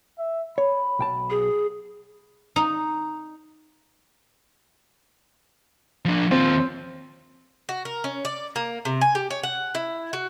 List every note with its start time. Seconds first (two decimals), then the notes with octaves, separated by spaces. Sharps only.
0.19 E5
0.58 C#5 B5
0.99 B1 G5 A5
1.30 G#4
2.56 D#4
6.05 F3 D4
6.31 D#2 C4 F4
7.69 F#4
7.85 A#4
8.04 C#4
8.25 D5
8.56 A#3
8.85 C3
9.01 G#5
9.15 G4
9.30 C#5
9.43 F#5
9.75 E4
10.13 F#4